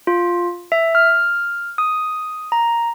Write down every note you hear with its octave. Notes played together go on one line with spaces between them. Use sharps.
F4
E5
F6
D#6
A#5